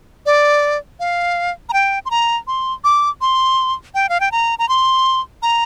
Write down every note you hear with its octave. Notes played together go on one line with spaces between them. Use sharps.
D5
F5
A#5
G5
C6
A#5
C6
D6
C6
G5
F5
G5
A#5
A#5
C6
A#5